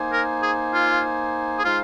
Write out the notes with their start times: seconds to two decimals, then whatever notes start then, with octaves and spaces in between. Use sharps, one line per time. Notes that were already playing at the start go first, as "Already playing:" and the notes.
Already playing: A#3 D#4 C5 G#5
0.12 A#4
0.43 G#4
0.74 F4
1.59 G#4
1.65 G#3 D#4 F4 C5 F5